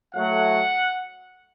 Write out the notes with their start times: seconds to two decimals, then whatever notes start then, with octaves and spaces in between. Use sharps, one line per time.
0.15 A2 F#3 A3 F#5